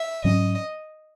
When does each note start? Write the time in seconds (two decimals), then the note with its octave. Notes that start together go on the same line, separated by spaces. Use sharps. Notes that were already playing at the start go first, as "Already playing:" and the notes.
Already playing: E5
0.24 G#2 F#3 C#4 D#5